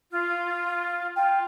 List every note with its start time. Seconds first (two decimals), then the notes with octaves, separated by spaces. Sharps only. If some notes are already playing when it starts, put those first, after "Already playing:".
0.11 F4
1.16 F4 G5